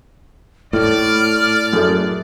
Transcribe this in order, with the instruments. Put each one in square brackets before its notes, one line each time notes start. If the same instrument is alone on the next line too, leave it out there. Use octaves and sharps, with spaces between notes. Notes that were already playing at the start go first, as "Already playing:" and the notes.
[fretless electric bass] A2 [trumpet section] D5 [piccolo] F6
[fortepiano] F#2 A3 G#4